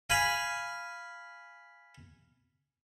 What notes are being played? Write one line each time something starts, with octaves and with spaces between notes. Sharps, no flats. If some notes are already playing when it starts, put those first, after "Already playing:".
F5 G#5 B5